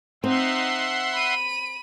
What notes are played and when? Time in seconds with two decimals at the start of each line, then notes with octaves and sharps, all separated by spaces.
0.24 C4 D#4 E5 F#5 C6
1.13 B5 D#7